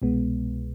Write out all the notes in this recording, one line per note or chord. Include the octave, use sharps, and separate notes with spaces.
C2 B2 G#3 B3